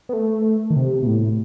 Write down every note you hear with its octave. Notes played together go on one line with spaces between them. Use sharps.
B3
A3
D#3
C3
B2
A2